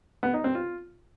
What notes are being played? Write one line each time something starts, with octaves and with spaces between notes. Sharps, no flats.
B3
D#4
C4
F4